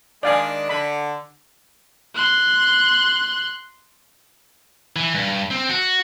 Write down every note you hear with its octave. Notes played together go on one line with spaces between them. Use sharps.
D#3 G#3 D4 D5 F5 G#5
D3 B5
C6 F#6
E3
G2
C4
F#4